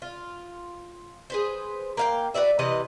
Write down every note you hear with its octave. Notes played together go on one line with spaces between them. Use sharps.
F4
G#4 B4 C5
A#3 F5 G5
F#4 B4 D5 E5
C3 E3 B4 D#5